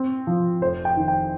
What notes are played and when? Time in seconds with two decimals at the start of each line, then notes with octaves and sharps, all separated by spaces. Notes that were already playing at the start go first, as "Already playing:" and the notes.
Already playing: C4
0.27 F3
0.61 F1 C5
0.85 G5
0.97 D#3
1.08 G5